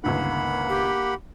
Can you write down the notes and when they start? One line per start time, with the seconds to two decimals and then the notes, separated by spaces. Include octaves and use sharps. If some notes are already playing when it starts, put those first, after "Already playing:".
0.04 G1 C#2 D#3 A#3 F#5 B5
0.69 G4